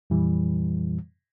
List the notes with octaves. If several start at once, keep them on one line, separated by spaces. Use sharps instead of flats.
F2 A#2 E3 G3